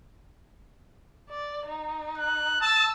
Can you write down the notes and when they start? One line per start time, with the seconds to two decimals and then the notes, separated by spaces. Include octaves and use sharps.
1.30 D5
1.66 D#4
2.18 F#6
2.61 A5 E6